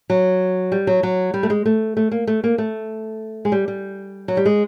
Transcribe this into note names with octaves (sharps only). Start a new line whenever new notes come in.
F#3
G3
F#3
F#3
G3
A3
G#3
A3
A3
A#3
A3
A#3
A3
G#3
G3
G3
F#3
G3
G#3